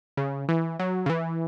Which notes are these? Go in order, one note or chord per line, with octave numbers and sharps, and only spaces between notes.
C#3
E3
F#3
C#3
E3